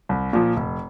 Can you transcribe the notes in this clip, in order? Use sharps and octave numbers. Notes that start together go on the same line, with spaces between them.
C2
A#2 F3
F1